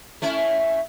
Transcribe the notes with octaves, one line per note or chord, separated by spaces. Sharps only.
A3 C#4 E4